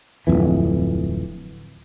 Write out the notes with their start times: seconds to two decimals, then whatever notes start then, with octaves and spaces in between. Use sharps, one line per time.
0.27 D1 C2 F2 E3